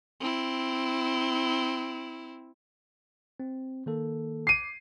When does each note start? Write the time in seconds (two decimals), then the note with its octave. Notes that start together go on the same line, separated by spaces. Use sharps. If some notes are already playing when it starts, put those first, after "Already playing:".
0.21 C4 E4
3.40 C4
3.86 D#3 A#3 A4
4.47 D6 C7 D#7